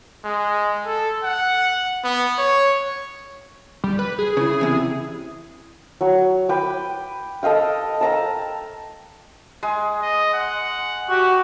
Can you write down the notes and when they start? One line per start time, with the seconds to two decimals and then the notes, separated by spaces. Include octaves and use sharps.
0.25 G#3
0.86 A4
1.24 F#5
2.04 B3
2.38 C#5
3.84 G3
3.99 B4
4.19 G#4
4.37 C#3 E4
4.61 E2 C3
6.01 F#3 C#6
6.49 B4 G5 D6
7.43 A4 D#5 F5 G5
8.01 A5 A#5 E6
9.63 G#3
10.02 D#5
10.34 F#5
11.10 F#4 G4